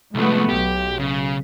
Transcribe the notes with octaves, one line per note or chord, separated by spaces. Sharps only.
C2 F3 G#3 A3 B3
B1 G4
C#3